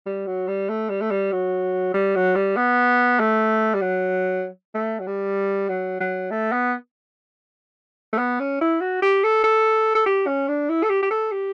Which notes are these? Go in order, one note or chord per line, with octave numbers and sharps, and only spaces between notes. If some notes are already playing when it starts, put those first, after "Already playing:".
G3
F#3
G3
A3
G3
A3
G3
F#3
G3
F#3
G3
B3
A3
G3
F#3
A3
F#3
G3
F#3
F#3
A3
B3
A3
B3
C#4
E4
F#4
G4
A4
A4
A4
G4
C#4
D4
E4
A4
G4
G4
A4
G4